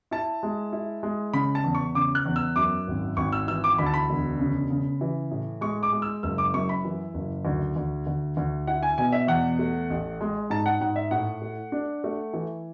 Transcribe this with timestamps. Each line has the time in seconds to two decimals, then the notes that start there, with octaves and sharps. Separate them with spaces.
0.11 E4 A5
0.43 G#3
0.73 E4
1.03 G#3
1.34 C#3 B5
1.55 A5
1.64 E2
1.75 C#6
1.95 C#3 D6
2.15 F#6
2.26 E2
2.36 E6
2.56 F#2 D6
2.87 G#1
3.17 G#1 C#6
3.33 E6
3.47 E3 E6
3.64 D6
3.78 D2 B5
3.86 A5
3.94 B5
4.09 E1
4.39 C#3
4.70 C#3
5.01 E3
5.31 A2
5.61 G#3 C#6
5.83 D6
5.92 G#3
6.02 E6
6.23 F#1 E6
6.38 D6
6.53 F#2 C#6
6.69 B5
6.85 E3
7.14 F#1
7.45 D2
7.76 D2
8.07 D2
8.37 D2
8.67 E4 F#5
8.83 G#5
8.98 B2 G#5
9.12 E5
9.28 E2 F#5
9.59 A3
9.90 A1
10.21 G#3
10.50 G#2 A5
10.66 F#5
10.80 G#2 F#5
10.96 E5
11.11 A2 F#5
11.42 A3
11.72 D4
12.04 A3
12.33 E3